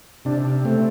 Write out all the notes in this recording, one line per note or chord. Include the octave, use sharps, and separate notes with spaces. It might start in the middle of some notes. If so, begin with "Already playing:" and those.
C3 D4
A3 C4